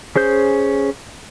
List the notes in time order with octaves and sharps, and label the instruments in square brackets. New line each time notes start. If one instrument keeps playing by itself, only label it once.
[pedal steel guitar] C#4 G#4 C5 G6